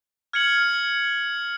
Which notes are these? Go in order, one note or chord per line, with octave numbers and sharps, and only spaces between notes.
F6 G#6 C#7 F#7